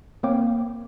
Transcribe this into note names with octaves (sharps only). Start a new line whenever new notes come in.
A#3 C4 C#5 F5 G5 D6